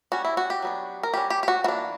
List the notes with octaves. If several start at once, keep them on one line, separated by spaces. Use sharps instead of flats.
G3 C#4 F#4
E4
F#4
G4
F#3 B3 D4
A#4
G3 C#4 G4
G4
G4
F#4
E3 A#3 D4 F#4